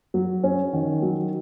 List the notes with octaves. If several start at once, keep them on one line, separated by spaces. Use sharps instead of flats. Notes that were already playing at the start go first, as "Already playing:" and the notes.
F#3
C#4
D#3
F#3